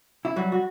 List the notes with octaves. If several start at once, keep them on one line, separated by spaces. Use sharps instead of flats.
E4
F#3 G3 F#4
F#4